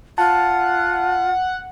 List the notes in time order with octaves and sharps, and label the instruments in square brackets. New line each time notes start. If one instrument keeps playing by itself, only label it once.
[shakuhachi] F4 [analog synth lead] F#5 [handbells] A5